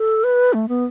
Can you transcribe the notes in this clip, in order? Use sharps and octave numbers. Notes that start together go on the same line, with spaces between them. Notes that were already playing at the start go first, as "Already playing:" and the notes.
Already playing: A4
B4
A3
B3